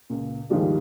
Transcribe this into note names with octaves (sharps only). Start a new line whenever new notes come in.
C#2 A#2
D#2 G#2 D#3 F3 G3 D4